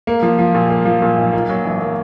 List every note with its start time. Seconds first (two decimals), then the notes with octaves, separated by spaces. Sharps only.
0.07 A#3
0.23 F3
0.39 F3
0.55 A#2
0.70 A#3
0.85 F3
1.02 A#2
1.18 B1
1.33 A#3
1.49 F#3
1.65 A1
1.81 A#3